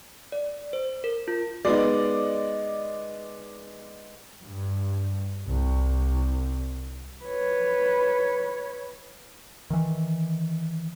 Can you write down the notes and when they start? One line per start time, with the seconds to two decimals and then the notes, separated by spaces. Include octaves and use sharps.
0.32 D5
0.73 C5
1.04 A#4
1.28 F4
1.65 G#3 B3 D#4 D5
4.42 G2
5.49 C2
7.25 B4 C#5
9.70 D#3 E3